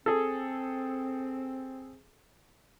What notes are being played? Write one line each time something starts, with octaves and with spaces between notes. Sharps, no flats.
C4 G#4 A4